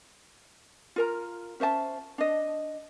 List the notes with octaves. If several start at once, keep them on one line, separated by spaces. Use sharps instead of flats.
F4 A#4 A#5
C#4 C5 E5 A5
D4 D#5